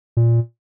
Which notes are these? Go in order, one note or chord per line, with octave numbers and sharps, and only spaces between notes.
A#2